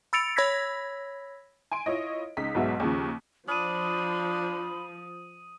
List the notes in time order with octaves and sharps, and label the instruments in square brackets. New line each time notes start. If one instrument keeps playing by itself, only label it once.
[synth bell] B5 E6 A6 C#7 D7 F7
C#5 B5 E6 G#6 A#6 B6
[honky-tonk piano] G#5 C6 D7
E4 F4 C#5 D#5
C#2 D#4 B6
B1 G#2 B2 F#3 B3 E5
D#2 C#3 F3
[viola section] F3 [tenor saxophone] D4 [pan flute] B5 [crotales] D#6 D#7